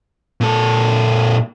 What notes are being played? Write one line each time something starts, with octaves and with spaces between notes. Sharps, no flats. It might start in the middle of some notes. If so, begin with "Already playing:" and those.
A#2 A4